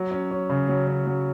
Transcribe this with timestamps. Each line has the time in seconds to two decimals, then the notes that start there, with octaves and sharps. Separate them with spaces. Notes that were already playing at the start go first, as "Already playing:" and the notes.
Already playing: F#3
0.11 C#4
0.31 C#4
0.50 C#3
0.69 F#3
0.87 C#4
1.07 F#3